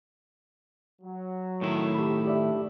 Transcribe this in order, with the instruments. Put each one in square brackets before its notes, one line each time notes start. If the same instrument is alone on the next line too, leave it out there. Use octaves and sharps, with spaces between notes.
[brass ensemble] F#3
[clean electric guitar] A2 D#3 E4
[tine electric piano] G4 B5
[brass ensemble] D4 [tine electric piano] G4 D5 E5